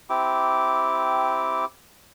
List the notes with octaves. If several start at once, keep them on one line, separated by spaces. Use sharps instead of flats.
C4 E4 G4 D6